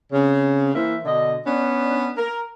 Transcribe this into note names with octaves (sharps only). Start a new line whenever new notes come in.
C#3 C4
E3 A#3 C5 E5
B2 D3 D#5
B3 C#4 D4
A#4